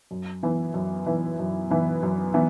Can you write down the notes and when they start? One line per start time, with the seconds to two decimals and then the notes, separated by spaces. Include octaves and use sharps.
0.11 F#2
0.43 E3 B3 E4 B4
0.74 F#2
1.06 E3 B3 E4 B4
1.39 F#2
1.70 E3 B3 E4 B4
2.03 F#2
2.34 E3 B3